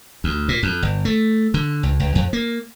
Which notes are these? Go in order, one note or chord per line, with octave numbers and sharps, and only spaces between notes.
D2
A#2
F2
G1
A3
D3
C#2
C#2
F2
A#3